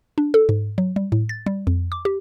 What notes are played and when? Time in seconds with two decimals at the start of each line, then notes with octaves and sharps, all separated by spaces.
0.18 D4
0.34 A4
0.49 G#2
0.78 F#3
0.96 G3
1.12 A2
1.29 A6
1.46 G3
1.67 F2
1.92 D6
2.05 G4